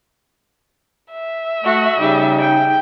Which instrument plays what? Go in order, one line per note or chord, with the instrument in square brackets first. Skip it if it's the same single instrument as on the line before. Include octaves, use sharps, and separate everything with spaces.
[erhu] E5
[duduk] A3 [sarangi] F#4
[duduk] C#3 [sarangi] G3 [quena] D#4
[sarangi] G5